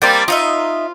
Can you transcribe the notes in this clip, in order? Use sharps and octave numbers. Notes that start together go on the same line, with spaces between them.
G3 A#3 C4 G5 A5 C6
D#4 F4 D#5 E5